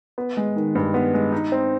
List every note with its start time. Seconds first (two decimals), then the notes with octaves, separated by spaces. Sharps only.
0.18 B3
0.37 G#3
0.56 D#3
0.75 G2
0.94 B3
1.14 G#3
1.32 D#4
1.52 C4